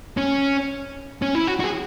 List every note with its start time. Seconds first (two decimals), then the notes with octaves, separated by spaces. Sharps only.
0.17 C#4
1.22 C#4
1.35 E4
1.47 F#4
1.60 F#4
1.64 G#4